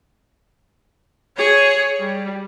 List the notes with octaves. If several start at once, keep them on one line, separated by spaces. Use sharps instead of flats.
G#4 C#5
G3